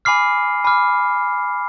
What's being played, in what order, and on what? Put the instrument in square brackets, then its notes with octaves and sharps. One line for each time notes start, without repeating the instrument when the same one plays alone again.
[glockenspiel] G#5 B5 D6 F6 C7
G#5 B5 D6 F6